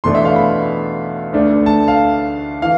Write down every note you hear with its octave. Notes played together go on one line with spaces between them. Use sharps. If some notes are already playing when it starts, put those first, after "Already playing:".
E2 B2 A3 D4 C6
E5
F5
B5
D2 D3 A3 D4
A5
F5
E3 F5